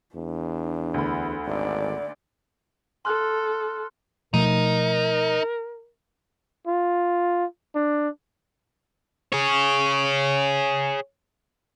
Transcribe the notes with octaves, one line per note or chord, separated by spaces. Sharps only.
E2 D4
D2 B5
G#1 D5
A4 C6 F6 F#6
B2 F3 A3 D#4 A#4
F4
D4
G#4 C#5